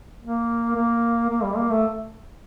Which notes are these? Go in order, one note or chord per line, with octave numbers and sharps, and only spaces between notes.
A#3
A#3
A#3
G3
A#3
A3